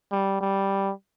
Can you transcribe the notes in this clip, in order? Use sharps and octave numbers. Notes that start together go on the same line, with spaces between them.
G3
G3